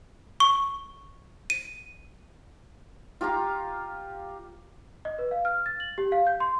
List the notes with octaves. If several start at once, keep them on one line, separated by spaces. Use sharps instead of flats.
C#6
D#7
F4 G4 F5 A#5
D#5
B4
F5
F6
A6
F#7
G4
F5
G6
C6